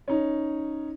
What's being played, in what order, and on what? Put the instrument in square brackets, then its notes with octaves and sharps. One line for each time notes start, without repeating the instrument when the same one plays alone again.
[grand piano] C#4 D#4